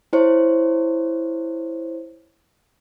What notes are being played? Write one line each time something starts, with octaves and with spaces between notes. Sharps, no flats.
E4 C5 C#5